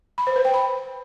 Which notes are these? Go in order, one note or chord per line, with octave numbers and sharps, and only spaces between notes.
B5
C5
B4
G5
B5